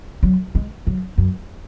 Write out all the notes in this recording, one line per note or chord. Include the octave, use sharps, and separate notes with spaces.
F#3
G#3
F#3
F#2